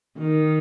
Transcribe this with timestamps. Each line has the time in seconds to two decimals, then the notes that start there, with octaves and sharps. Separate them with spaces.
0.18 D#3